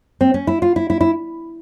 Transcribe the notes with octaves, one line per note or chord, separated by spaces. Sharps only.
C4
C#4
E4
F4
E4
E4
E4